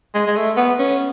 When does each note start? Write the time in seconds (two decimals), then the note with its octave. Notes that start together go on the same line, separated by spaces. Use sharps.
0.14 G#3
0.27 G#3
0.36 A3
0.57 B3
0.79 C#4